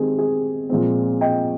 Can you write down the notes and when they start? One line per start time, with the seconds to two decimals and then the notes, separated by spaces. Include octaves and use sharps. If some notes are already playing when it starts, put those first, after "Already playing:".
Already playing: D#3 G#3 C4 G4 G#4
0.18 G#4
0.69 A#2 F3 G#3 C4
1.21 D#5 G5